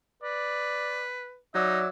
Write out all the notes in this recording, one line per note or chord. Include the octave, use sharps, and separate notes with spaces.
B4 D5
F#3 D#4 D5 E5